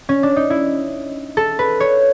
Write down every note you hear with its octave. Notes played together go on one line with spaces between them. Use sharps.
C#4
D4
D#4
E4
A4
B4
C#5